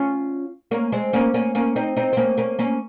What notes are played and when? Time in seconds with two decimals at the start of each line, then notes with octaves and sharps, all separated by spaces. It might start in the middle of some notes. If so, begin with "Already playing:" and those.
Already playing: C#4 F4
0.71 A#3 C#4
0.92 G#3 C4
1.13 A#3 C#4
1.34 A#3 C#4
1.55 A#3 C#4
1.76 C4 D#4
1.96 C4 D#4
2.13 C4
2.17 A#3 C#4
2.38 A#3 C#4
2.59 A#3 C#4